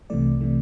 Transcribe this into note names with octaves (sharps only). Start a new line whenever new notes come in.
C2 C3 E3 A3 D5
C3 E3 A3